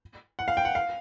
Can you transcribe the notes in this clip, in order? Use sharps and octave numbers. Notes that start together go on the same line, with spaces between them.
F#5
F5
G5
F#5
F5